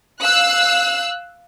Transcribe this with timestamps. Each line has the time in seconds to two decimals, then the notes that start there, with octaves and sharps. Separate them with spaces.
0.21 F5 E6 F#6